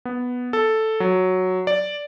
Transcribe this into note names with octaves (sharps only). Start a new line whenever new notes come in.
B3
A4
F#3
D5